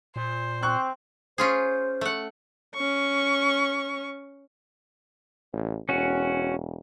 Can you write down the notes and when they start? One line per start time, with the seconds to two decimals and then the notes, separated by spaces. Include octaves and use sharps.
0.16 A#2 C5
0.63 C4 C#6 F#6
1.38 C#4 F4 G#4 C5
2.01 A3 F#5
2.75 C#4 C#6
5.53 A1
5.89 E1 C#4 F#4